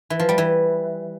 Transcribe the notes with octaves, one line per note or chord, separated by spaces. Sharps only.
E3
F3
G3
E3